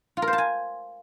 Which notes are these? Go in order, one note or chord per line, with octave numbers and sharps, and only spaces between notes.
F4
A#4
C5
A5
G#5